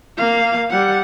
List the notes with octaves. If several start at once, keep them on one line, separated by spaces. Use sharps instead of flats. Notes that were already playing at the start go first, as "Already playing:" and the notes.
A#3 F5
G3 F#5